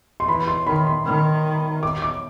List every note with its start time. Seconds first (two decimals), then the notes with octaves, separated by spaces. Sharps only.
0.20 C6
0.28 E3 B5
0.48 C6
0.66 D#3 B5
0.86 C6
1.05 D#3
1.83 D6
2.02 D6